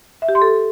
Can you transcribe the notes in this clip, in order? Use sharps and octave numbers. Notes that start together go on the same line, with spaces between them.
E5
G4
C6
A4